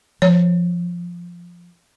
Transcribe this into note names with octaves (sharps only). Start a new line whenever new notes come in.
F3 C#5